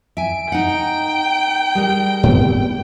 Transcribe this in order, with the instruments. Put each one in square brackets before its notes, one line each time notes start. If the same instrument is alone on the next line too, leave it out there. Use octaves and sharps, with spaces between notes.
[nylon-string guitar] E5 G#5 [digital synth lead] D7
[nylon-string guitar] D#4 F#5 [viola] G5
[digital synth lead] G3 [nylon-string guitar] G#4 A#4
[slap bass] G#2 B3 C4